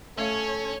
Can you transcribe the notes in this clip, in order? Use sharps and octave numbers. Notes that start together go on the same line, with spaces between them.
A3 C#4 A4 C#5 F5